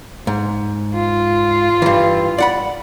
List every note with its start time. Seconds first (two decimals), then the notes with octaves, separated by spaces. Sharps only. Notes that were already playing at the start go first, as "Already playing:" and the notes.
0.27 G#2
0.94 F4
1.82 G2 E3
2.38 D5 F#5 B5